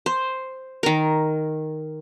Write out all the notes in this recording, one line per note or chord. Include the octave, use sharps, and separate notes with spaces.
C5
D#3 A#4